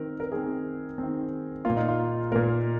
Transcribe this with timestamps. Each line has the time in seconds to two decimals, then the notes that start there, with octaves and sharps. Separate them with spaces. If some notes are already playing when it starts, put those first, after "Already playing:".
Already playing: D#3 C4 A#4
0.20 A#4
0.32 D#3 C4 G#4
0.98 D#3 C4
1.65 A#2 A#3 F4
1.77 D#4
1.88 F4
2.32 A#2 A#3 A#4